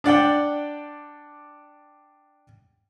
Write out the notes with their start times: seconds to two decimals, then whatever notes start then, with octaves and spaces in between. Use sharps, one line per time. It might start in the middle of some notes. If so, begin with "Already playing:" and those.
0.04 D4 D5 F#5 G5